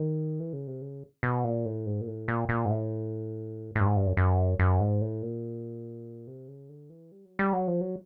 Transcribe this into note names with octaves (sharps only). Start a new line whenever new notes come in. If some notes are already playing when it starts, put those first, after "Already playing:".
Already playing: D#3
E3
C#3
C3
C#3
B2
A#2
A2
G#2
A#2
A2
A#2
A#2
G#2
A2
A2
G2
G#2
G2
F#2
F#2
F#2
G#2
A2
A#2
C3
C#3
D3
E3
G3
F#3
G3
F#3
F3
F#3